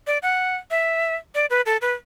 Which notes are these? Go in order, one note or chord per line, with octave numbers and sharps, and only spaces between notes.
D5
F#5
E5
D5
B4
A4
B4